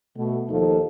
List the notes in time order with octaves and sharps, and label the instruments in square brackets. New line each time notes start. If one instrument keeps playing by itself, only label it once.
[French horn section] B2 A3
D#2 F3 D#4 A4